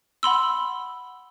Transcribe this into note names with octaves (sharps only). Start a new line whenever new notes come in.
F#5 B5 C6 E6